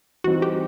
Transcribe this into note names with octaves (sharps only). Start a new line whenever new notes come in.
E3 G3 C4 D#4 F#4
G4